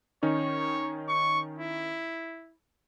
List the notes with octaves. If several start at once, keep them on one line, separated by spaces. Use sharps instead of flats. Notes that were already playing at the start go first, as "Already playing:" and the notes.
D#3 C#4 D#4 C#5
C#6
E4